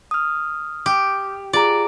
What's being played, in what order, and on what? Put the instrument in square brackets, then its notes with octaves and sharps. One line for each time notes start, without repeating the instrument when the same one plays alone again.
[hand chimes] D#6 F6
[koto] G4
[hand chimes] F4 G#4 A#5 [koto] D5